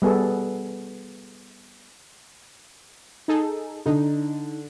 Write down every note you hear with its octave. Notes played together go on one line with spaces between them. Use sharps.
G3 B3 G#4 A4
D#4 G#4 A4
D3 D#4